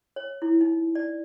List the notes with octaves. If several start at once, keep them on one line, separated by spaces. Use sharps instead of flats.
C#5
E4
D#4
D5